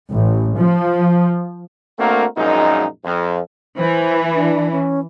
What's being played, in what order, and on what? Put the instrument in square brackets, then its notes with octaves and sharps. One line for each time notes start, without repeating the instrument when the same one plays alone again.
[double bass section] A1
F3
[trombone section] A3 A#3 C4 D4 F#4 A#4
A#1 F#2 A#2 G#3 D#4
F2
[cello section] E3 [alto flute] C5
[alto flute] D4
C#4